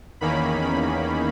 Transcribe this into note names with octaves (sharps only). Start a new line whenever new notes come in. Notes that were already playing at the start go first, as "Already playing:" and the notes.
E2 D#3 A#3 C#4 B5
B5